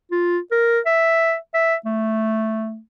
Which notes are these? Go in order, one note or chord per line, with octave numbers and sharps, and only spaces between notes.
F4
A#4
E5
E5
A3